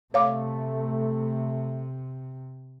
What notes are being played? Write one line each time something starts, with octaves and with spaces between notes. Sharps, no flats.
C3 A3 C#5 F5 D6